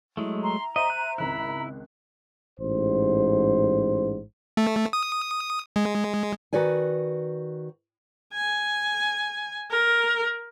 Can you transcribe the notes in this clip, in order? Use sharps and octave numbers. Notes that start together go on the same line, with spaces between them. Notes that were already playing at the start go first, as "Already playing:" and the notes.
F#3 G#3 A3 E4
A#5 C6
C5 D#5 E5 D#7
F#6
G#1 C#2 E4 B5 F#6
A1 G#2 C5
A3
D#6
G#3
D#3 F#4 B4 D5 G#5
G#5
A#4